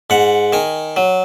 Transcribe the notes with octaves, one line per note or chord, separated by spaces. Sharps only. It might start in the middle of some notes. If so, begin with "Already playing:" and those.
G#2 F#5
D#3 G#5
F#3